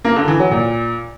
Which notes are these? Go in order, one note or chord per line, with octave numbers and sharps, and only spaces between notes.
A#3
D3
E3
F#3
A#2